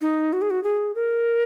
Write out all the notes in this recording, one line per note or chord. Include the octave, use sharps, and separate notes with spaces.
D#4
F#4
G#4
F#4
G#4
A#4